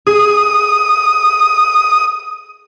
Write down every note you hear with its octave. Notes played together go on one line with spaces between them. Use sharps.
G#4 D#6